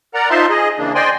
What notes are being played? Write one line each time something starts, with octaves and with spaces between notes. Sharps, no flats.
A#4 D5 F#5 A#5
D#4 F4 C5 E5 A5 C6
G#4 D#5
C#3 E3 A#3 D4
C5 D5 D#5 G5 G#5 C6